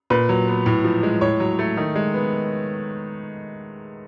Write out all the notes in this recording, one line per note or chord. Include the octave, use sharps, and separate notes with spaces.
A#2 B4
F#3
B3
A2
F3
G#3
A2 C#5
F#3
A3
D#3
G#3
B3